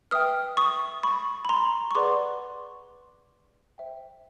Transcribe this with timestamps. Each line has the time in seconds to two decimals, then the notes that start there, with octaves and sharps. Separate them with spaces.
0.11 B4 E5 G5 D#6 F6
0.57 C#6 D#6
1.03 B5 C#6
1.45 B5
1.49 A#5 C6
1.91 C#6
1.95 G#4 B4 D5 F#5 C6 D6
3.78 C5 E5 G5